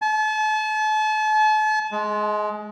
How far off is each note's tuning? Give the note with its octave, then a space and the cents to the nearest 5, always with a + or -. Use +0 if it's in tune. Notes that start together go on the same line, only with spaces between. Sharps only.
A5 -40
G#3 +20